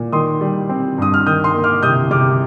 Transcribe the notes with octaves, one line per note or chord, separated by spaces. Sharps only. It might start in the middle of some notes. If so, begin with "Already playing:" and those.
Already playing: A#2
D#3 C6 D#6
G3
C4
G2 D#6
F6
D#3 D#6 G6
C6 D#6
A#3
D6 F6
C3 D#6 G6
C3 D6 F6